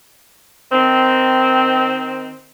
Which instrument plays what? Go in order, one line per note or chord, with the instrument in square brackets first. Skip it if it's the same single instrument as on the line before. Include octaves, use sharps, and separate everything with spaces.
[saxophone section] D#3 C4